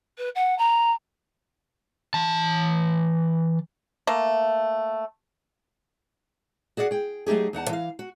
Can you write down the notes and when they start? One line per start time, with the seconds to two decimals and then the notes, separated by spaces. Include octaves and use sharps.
0.18 B4
0.35 F#5
0.58 A#5
2.14 E3 A5
4.07 A3 A#3
6.77 F#4 G#4 D5 E5 F#5
6.91 G#4 G5
7.26 F#3 A3 D#4 G4 G#4
7.53 E2 D#4 F#5 A5
7.69 E3 F5
7.99 F#4